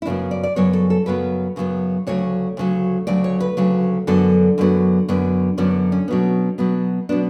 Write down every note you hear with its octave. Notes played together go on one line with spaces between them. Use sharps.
E4
F#2 C#3 F#3 B3 D4
D5
D5
F#2 C#3 F#3 B3 C#5
A4
A4
F#2 C#3 F#3 B3 B4
F#2 C#3 F#3 B3
D2 C#3 F#3 C#5
D2 C#3 F#3
D2 C#3 F#3 D5
C#5
B4
D2 C#3 F#3
F#2 D3 F#3 B3 A4
F#2 D3 F#3 B3
F#2 D3 F#3 B3
F#2 D3 F#3 B3 C#4
C#4
B2 F#3 B3
B2 F#3 B3
B2 F#3 B3 D4